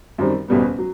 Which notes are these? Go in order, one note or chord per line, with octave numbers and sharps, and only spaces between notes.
F#2 D#3 G3 C4
F#1 E2 B2 G3 B3
F#3